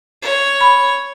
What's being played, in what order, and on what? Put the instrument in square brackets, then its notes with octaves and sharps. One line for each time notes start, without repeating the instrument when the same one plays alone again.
[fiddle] C#5
[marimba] B5